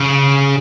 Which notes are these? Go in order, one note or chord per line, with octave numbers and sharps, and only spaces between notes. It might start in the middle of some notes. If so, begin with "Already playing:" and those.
Already playing: C#3